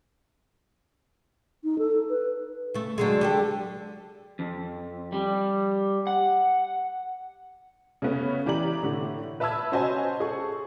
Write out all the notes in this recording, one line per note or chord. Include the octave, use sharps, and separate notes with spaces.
D#4
A4
B4
C#3 A3
D3 F#3 G#3
D3 G4 A4
F2
G3
F#5
C#3 A3 B3 C#4
E3 G4 D5 A#5 F#7
A2 D3
B4 E5 A5 B5 E6 G#6
C#4 F#4 C5 D#5 G#5 A5
G#4 A4 C#6